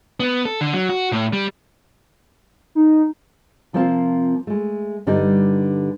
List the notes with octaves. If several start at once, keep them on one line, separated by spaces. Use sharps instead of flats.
B3
A4
D3
F#3
F#4
A2
G3
D#4
C3 F3 A#3 C4 F4 A5
G#3 A3
G2 D3 G3 D#4